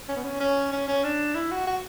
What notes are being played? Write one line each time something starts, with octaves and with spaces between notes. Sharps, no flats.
C#4
B3
C#4
C#4
C#4
C#4
D4
E4
F#4
F#4